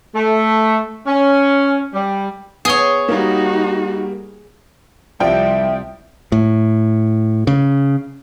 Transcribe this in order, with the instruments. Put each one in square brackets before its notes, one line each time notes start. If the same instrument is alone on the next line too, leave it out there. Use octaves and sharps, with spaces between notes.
[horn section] A3
C#4
G3
[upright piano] B3 G7 [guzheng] G#4 C#5
[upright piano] G3 A#3 [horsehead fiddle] D#4 F#4
[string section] C2 [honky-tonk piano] F3 G5 [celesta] D5 [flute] E5
[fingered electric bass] A2
C#3